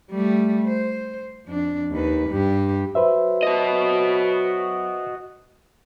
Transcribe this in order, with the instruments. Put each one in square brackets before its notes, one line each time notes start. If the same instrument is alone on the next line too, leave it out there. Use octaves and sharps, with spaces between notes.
[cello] G3 A3
C5
F2 D4
D#2 B4
G2 G4
[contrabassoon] F#3 [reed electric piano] B4 C5 E5
[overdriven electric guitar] F#4 D#5